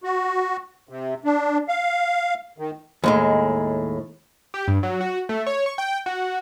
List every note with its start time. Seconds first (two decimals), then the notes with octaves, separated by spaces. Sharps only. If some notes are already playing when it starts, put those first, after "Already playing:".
0.03 F#4
0.89 C3
1.24 D4
1.68 F5
2.58 D#3
3.04 D#2 A2 G#3
4.54 G4
4.68 G2
4.83 F#3
5.01 F#4
5.29 A3
5.47 C#5
5.66 C#6
5.78 G5
6.06 F#4